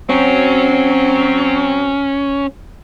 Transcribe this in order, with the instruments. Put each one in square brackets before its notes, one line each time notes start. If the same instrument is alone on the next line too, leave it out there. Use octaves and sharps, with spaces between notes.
[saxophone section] F#3 C4 [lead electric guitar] C#4